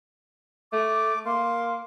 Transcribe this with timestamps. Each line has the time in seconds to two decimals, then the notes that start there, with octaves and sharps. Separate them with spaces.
0.73 A3 D6
1.26 A#3 C6